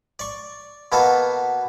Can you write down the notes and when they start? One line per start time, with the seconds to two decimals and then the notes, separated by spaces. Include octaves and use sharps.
0.19 D5 C#6
0.92 B2 A#3 B3 F#4 A4